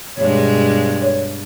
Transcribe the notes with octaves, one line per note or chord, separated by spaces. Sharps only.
G2 B2 G#3 C#5